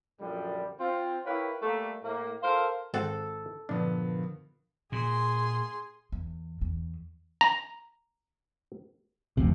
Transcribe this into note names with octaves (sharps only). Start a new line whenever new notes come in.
F#2 A#2 D3 F3 G3
C4 F4
E4 G4 A#4 B4 C#5 F5
G3 A3 A#3
A2 A#3
F4 A4 A#4 C5 F5
G#1 C4 A4 F#5
G2 A#2 D3 F3 B3 D4
A#2 G#4 C6
E2
E2
A#5
F1 D2 C3